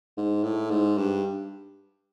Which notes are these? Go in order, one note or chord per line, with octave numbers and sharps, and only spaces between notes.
G#2
A2
G#2
G2